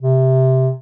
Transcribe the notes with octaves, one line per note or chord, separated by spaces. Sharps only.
C3